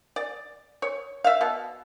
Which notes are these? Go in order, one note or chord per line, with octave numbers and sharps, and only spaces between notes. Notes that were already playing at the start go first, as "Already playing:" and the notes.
D5
C#5
E5 F5
B2